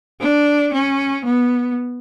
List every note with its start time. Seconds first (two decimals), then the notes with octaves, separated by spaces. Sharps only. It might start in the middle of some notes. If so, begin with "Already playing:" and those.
0.20 D4
0.72 C#4
1.25 B3